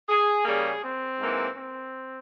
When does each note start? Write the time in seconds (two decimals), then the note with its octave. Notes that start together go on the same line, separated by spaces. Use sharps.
0.09 G#4
0.45 C#3 G3 A#3 G#4
0.83 C4
1.19 G#2 E3 A#3
1.57 C4